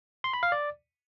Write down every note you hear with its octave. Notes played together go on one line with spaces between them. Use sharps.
C6
B5
F5
D5